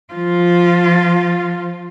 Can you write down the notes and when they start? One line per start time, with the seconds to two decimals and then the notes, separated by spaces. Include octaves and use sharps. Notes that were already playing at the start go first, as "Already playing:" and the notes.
0.14 F3 F4